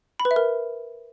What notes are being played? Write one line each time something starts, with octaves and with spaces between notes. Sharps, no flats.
B5
B4
E5
A#4